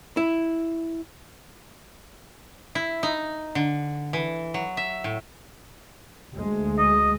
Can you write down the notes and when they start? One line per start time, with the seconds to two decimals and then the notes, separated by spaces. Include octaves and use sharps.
0.17 E4
2.75 E4
3.03 D#4
3.55 D3
4.13 E3
4.54 F#3
4.77 E5
5.04 A2
6.34 D2 G#3
6.79 D#5